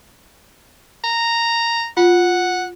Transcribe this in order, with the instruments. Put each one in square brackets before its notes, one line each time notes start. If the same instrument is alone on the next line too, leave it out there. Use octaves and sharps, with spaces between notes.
[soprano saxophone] A#5
[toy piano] F4 [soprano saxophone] F#5